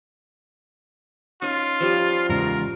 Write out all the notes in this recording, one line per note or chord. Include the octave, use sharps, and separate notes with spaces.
C#4 D#4 F4
F3 G3
E2 G#2 C#3 A#4